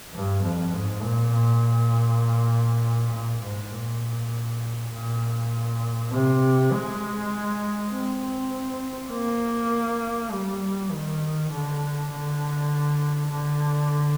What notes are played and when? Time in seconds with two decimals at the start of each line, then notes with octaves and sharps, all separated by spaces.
0.14 G2
0.43 F2
0.74 G#2
1.03 A#2
1.33 A#2
3.13 A#2
3.43 G#2
3.73 A#2
4.92 A#2
6.12 C3
6.72 G#3
7.92 C4
9.11 A#3
10.32 G3
10.91 D#3
11.51 D3
12.11 D3
13.30 D3